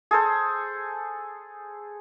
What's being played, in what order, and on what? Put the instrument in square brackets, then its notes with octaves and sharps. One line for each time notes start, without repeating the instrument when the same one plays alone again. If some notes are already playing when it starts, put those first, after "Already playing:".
[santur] G#4 A4 C5